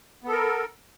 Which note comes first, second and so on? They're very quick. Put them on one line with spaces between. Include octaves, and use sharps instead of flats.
B3 A4 A#4